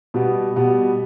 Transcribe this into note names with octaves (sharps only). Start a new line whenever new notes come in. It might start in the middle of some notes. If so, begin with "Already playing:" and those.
B2 G3 B3
B2 G3 B3